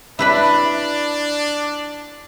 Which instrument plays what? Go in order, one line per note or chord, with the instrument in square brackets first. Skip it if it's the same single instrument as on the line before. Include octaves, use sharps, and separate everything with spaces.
[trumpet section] D4 [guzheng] E4 B4 B5